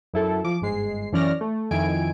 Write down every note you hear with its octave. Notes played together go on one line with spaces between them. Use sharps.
F#2 E4 A4
F3 D6
G1 G#2 G#3 C7
F#2 E3 C#4 D5 F6 A#6
A3
F2 D#3 E4 G#5 D7